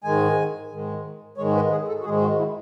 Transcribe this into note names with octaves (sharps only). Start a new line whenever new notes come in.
G#2 D#3 G#3 G#5
G#2 D#3 G#3
G#2 D#3 G#3 C#5
B4
G#4
A4
F#4
G#2 D#3 G#3 G#4
F#4
E4